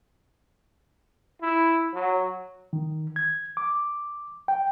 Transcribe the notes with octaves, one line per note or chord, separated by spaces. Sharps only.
E4
F#3
D#3
G#6
D6
G5